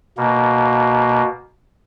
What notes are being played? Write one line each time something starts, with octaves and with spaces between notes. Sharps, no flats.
B2 A#3